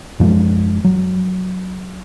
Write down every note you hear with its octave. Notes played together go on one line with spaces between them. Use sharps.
F#2 F3 G3 G#3
F#3